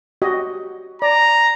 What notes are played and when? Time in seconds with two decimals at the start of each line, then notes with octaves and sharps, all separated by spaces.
0.22 F#4 G4 D#5
1.02 D5 A#5